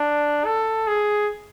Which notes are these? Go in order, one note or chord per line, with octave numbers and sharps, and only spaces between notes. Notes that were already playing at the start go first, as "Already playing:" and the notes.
Already playing: D4
A4
G#4